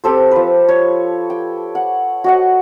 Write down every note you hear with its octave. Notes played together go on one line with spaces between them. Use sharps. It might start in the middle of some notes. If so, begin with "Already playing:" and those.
C4 G4 A4 C5
F3 B4
C#5
G5
F#5
F#4 D#5 F#5